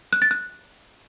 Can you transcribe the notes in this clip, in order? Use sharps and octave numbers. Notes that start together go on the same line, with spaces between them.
F#6
A6
F#6